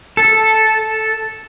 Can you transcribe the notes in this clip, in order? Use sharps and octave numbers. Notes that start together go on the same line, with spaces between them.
A4